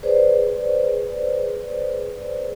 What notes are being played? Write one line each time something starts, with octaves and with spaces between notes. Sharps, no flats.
G#4 B4 C5 D5